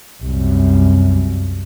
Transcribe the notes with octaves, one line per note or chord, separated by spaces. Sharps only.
C2 F#2